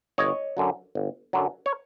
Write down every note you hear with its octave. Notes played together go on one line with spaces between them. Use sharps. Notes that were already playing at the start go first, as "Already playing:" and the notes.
G1 C#5 D#5
F#2 D3 F#3
G1
F#2 D3 F#3
C#5